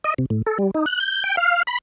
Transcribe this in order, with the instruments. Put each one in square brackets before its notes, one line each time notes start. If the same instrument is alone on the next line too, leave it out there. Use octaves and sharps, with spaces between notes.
[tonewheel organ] D#5
C3
A2
A4
G3
D#4
F#6
G6
G5
F5
B5